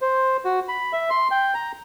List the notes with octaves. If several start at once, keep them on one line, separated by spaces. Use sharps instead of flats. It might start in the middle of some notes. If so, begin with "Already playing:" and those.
C5
F#4
B5
E5
C6
G5
A#5